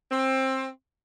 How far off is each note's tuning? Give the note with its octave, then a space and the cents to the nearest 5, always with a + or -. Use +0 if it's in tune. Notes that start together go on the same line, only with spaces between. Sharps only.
C4 +20